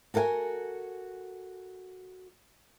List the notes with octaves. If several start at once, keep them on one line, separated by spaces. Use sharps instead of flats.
F#4 A4 A#4 F#5 G#5